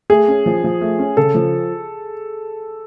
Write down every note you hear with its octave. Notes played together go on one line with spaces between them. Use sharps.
A3 G#4
C#4
F3
F3
A3
C#4
C#3 A4
F3